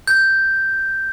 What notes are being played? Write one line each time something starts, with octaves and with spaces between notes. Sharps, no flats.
G6